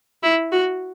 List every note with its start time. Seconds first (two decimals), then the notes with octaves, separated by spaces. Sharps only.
0.23 E4
0.52 F#4